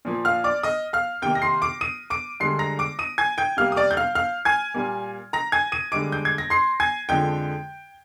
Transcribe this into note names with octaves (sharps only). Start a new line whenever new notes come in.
A#2 F3 A#3
F5 F6
D5 D6
D#5 D#6
F5 F6
C3 D#3 A#3 G5 G6
A#6
C6 C7
D6 D7
D#6 D#7
D6 D7
G2 D3 G#3 C6 C7
A#5 A#6
D6 D7
D#6 D#7
G#5 G#6
G5 G6
C3 G3 A#3 F5 F6
D#6
D5 D6
G6
F5 F6
F5 F6
G#5 G#6
A#2 G3 A#3
A#5 A#6
G#5 G#6
D#6 D#7
G2 D3 G#3 D6 D7
G6
G#6
A#6
C6 C7
G#5 G#6
F2 D3 F3 G#3 G5 G6